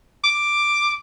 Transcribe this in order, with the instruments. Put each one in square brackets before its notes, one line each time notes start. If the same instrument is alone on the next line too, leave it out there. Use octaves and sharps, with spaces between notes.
[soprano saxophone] D6